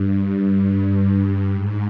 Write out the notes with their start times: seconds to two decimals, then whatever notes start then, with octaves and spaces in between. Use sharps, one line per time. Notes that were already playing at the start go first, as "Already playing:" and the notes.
Already playing: G2
0.62 G2
1.54 G#2